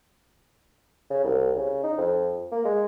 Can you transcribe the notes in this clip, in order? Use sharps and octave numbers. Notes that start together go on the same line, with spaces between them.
C#3
C2
C#3
D#4
F2
A#3
G#3